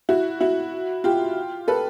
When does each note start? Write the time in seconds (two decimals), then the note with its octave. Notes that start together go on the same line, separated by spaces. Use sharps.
0.09 E4 F#4
0.41 E4 F#4
1.04 F4 G4
1.68 A4 B4